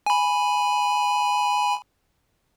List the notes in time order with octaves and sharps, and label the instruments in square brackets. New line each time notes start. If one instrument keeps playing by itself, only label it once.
[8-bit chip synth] G#5 B5